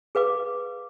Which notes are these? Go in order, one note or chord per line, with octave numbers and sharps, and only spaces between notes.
G#4 B4 F5 D6